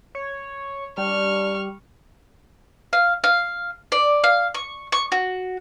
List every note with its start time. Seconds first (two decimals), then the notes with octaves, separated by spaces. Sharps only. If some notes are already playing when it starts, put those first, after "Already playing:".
0.15 C#5
0.98 G3 D4 C#6 F6
2.93 F5
3.24 F5
3.92 D5
4.24 F5
4.54 C#6
4.92 C#6
5.12 F#4